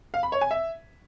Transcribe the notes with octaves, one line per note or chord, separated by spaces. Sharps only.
F5
B5
C#5
G#5
E5